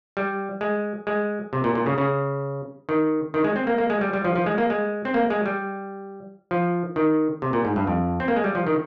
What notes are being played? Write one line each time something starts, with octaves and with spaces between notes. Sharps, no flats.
G3
G#3
G#3
C3
A#2
A#2
C#3
C#3
D#3
D#3
G#3
C4
A#3
A#3
G#3
G3
G3
F3
F3
G#3
A#3
G#3
C4
A#3
G#3
G3
F3
D#3
C3
A#2
G#2
G2
F2
C4
A#3
G#3
G3
F3
D#3